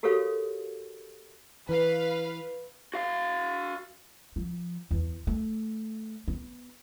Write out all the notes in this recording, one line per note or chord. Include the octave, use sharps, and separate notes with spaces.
F#4 G4 A4 A#4 C#5 F5
E3 B4 F5
F#4 F5
F3
E2
A3
B3